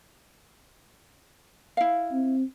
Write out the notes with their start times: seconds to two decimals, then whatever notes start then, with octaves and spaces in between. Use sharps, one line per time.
1.77 E4 F5
2.12 C4